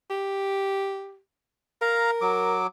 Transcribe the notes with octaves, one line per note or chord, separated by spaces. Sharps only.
G4
A#4 F5 A#5
F#3 D6